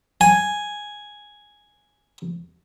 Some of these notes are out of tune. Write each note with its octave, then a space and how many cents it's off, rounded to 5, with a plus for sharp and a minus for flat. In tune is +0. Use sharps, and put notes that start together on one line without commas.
G#5 +0